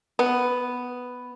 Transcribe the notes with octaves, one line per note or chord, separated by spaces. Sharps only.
B3